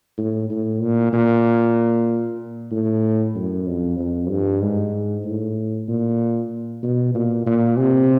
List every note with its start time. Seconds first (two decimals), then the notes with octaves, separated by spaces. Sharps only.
0.18 A2
0.50 A2
0.81 A#2
1.13 A#2
2.72 A2
3.35 F#2
3.67 F2
3.98 F2
4.30 G2
4.61 G#2
5.25 A2
5.88 A#2
6.83 B2
7.15 A#2
7.46 A#2
7.78 C3